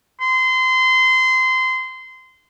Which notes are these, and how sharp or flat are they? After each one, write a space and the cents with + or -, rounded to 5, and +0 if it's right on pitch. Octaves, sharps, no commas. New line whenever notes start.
C6 -25